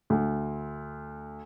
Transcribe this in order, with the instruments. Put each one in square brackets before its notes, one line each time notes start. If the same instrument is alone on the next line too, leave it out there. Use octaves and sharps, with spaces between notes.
[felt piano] D2